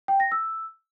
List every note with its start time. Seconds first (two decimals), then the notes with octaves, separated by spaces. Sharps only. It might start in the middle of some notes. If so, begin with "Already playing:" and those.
0.08 G5
0.20 A#6
0.32 E6